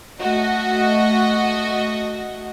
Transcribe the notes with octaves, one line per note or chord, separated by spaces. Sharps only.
A3 F#4 D#5